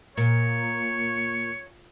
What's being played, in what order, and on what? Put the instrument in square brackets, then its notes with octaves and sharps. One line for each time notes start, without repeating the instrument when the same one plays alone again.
[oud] A#2 [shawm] C#5